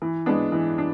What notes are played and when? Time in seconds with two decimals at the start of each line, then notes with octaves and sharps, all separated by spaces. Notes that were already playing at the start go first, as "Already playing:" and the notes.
0.02 E3
0.26 G#3 B3 D4
0.52 E3
0.78 D4